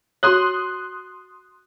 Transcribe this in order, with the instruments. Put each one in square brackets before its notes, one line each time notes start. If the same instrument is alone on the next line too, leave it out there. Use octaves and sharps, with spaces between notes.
[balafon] F#4 C#5 [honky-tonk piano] C6 D#6 F#6